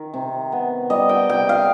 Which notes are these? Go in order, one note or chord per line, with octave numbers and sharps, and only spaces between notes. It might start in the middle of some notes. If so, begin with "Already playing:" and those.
Already playing: D#3
C3
B3
G3 D#5
G5
C3 G5
F5